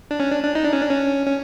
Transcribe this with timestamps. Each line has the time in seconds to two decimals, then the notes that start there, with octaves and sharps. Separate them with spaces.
0.11 D4
0.20 C#4
0.31 D4
0.43 D4
0.55 D#4
0.64 D4
0.73 C#4
0.82 D4
0.91 C#4
1.26 C#4